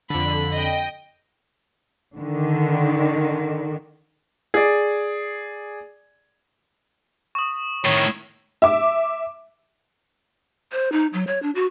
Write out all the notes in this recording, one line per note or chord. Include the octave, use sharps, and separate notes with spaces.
F2 D3 B5
D#5 G5
D3 D#3
G#4 D5
C#6 D#6
A2 D#3 C#5
E5 D6
C5
D#4
F#3
C#5
D4
F#4